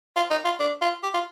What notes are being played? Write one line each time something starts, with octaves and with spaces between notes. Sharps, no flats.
F4
D#4
F4
D4
F4
G4
F4